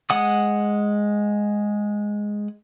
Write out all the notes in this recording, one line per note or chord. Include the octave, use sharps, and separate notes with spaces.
G#3 F#5 D#6